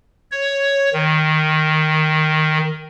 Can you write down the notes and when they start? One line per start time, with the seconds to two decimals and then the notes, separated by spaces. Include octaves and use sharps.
0.32 C#5
0.93 D#3